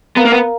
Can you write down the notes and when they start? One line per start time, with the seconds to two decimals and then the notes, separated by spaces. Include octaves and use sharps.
0.17 B3 A#4 F5 A#5
0.25 A#3
0.32 B3